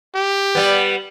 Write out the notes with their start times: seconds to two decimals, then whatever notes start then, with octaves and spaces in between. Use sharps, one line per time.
0.15 G4
0.55 G3 B3